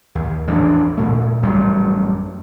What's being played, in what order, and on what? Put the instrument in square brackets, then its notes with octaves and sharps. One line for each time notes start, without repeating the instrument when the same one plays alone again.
[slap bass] D#2
A1 E2 E3 D4
A#2 A3
A1 F#2 G3 A3